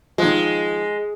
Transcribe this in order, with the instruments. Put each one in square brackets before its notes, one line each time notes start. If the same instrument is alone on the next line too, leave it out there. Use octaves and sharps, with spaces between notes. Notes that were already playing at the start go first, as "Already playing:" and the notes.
[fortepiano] D#3 F3 [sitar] G#3